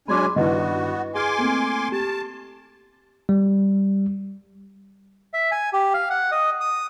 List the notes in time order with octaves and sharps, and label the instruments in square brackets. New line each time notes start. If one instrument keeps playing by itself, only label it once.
[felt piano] F#3 G#3 [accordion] C#4 D4 G#5 [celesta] B5 C6 D6
[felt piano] G2 D#3 [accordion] B3 F#4 [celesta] E4 B4 D#5
[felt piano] G#4 F6 [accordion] G#5 C6 D6
[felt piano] A3 A#3 C4
[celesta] G4 [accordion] A5
[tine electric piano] G3
[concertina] E5
G#5
G4
F5
F#5
D#5
D#6